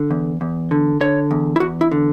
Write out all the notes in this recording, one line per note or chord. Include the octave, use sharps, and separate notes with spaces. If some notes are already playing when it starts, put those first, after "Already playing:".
Already playing: D3
E2
E2
D3
D3 C#5
E2
E4
E2 F#4
E4
D3